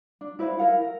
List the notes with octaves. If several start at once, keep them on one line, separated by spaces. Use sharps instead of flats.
D4
E4 B4 C5 F5
E4 A#4 F5 F#5
A#4